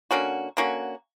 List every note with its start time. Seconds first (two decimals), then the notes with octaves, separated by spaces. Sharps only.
0.11 D3 A#3 C#4 F#4
0.57 D3 A#3 C#4 F#4